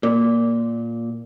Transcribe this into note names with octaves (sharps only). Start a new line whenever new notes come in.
A#2